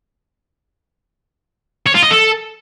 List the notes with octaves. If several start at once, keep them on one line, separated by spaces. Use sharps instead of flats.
C#5
F4
D#5
A4